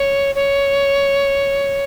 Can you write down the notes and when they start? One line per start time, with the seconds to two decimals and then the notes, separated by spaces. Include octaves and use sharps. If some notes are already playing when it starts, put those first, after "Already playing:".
Already playing: C#5
0.35 C#5